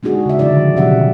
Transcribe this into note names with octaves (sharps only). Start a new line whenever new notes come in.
G#3 D4 D#4 F#4 G#4
C#3 E5
D3 D#3 F3 E4 D5
B2 F#3 C#4 G4 E5 F#5